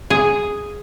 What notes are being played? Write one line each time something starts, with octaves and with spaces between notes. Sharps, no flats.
G#4